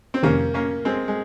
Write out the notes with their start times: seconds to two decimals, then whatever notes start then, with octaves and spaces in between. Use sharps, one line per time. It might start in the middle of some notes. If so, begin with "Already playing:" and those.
0.14 C4
0.23 F2 C3 D#3 A#3 C#4
0.54 A#3 C#4
0.85 G#3 C4
1.08 G#3